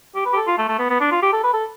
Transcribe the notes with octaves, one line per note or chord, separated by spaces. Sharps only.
G4
B4
G4
A4
F4
A3
A3
B3
B3
D4
F4
G4
A4
B4
A4